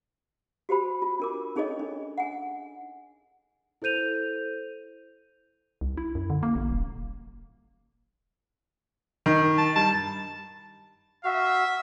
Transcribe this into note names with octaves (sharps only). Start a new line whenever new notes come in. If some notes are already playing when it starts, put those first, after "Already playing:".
F#4 G4 C5 B5
F4
D4 A#4 D6
C#4 D#4 G#4 A4 C#5 D#5
D4
F#5 G#5
E4 A4 C5 G6 D#7 F7
C2
E4
F#2
D3
A#3
A1
D#1
D#3
A5
G2 A5
F#4 E5 F5